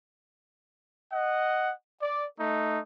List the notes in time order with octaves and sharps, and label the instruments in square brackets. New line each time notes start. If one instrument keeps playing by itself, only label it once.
[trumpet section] D#5 F#5
D5
A3 D#4